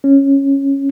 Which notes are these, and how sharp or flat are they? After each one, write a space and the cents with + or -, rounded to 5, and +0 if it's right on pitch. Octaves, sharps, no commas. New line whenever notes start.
C#4 -10